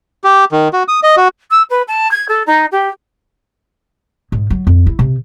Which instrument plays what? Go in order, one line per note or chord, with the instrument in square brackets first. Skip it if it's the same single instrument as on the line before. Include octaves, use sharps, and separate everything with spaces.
[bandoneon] G4
D#3
F#4
D#6
D#5
F#4
[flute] E6
B4
A5
G#6
A4
D#4
G4
[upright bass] G#2
F#3
F2
E4
C3